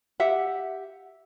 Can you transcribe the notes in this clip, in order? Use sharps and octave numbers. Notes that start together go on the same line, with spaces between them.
G4 E5 F#5